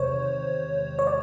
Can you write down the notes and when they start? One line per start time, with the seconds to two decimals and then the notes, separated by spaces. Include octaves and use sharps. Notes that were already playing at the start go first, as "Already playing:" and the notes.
Already playing: E2 C3 D#3 G#3 C5 C#5
0.99 C#5
1.07 D5